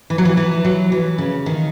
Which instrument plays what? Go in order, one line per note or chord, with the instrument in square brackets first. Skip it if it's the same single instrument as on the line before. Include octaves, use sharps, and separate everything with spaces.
[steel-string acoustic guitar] E3
F#3
E3
E3
F#3
E3
C#3
D#3